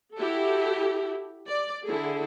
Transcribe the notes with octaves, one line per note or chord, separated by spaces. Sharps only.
E4 F#4 G4 A4
D5
D3 E4 G#4 A4